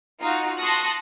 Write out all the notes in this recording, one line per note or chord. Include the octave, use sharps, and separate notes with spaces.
D#4 F4 F#4
A5 C6 C#6 D#6 F#6 A#6